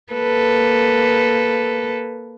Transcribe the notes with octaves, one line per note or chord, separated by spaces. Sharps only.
A#3 A4 B4